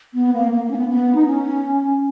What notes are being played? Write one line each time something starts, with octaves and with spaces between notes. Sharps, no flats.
B3
A#3
A#3
A#3
C#4
B3
B3
D#4
C#4